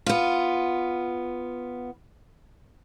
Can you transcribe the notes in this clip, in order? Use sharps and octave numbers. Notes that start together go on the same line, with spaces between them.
B3 F4